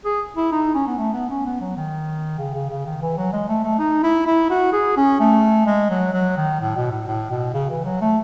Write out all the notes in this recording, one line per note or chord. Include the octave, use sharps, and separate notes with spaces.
G#4
E4
D#4
C#4
B3
A3
B3
C#4
B3
F#3
D#3
C#3
C#3
C#3
D#3
E3
F#3
G#3
A3
A3
D#4
E4
E4
F#4
G#4
C#4
A3
G#3
F#3
F#3
D#3
A2
B2
A2
A2
B2
C#3
E3
F#3
A3